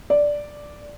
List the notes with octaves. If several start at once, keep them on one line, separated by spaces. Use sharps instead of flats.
D5